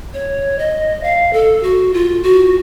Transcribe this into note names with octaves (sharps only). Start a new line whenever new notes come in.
C#5
D#5
F5
A4
F#4
F4
F#4